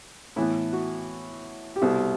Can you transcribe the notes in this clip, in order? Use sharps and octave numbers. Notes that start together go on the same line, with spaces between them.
A2 E3 B3 E4
F#4
G4
C2 B2 G3 B3 A4